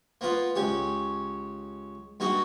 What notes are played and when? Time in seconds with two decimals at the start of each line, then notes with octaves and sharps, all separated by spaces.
0.21 A#3 B3 F4
0.55 C#2 C#4 G4
2.20 G2 A#3 D#4 F#4